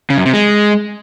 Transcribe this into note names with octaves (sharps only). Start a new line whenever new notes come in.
C#3
F#2
C3
G#3